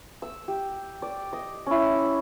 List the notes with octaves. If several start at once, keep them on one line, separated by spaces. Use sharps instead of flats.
E6
G4
D5
D#5
C#4 E4